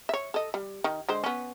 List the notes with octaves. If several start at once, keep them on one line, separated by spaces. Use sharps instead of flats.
C#5 E5
A4 D#5
G3
D#3
D3 G#3 C5
B3 C#4